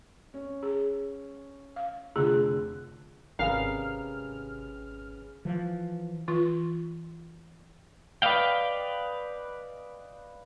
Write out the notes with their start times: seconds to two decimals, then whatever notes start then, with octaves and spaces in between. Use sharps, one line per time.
0.34 C#4
0.63 G#4
1.76 F5
2.16 F1 D3 F4 G#4 F#6
3.39 G#1 C3 C#4 G#4 A#4 B4 F5 F6
5.45 E3 F3
6.28 E3 F4
8.22 B4 D5 D#5 F5 G5